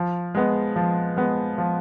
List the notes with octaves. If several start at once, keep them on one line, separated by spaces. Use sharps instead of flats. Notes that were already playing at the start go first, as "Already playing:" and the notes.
Already playing: F3
G#3 B3
F3
G#3 B3
F3